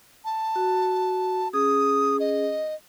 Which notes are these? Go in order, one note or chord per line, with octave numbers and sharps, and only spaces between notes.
A5
F#4
C#4 G#4 D#6
D#5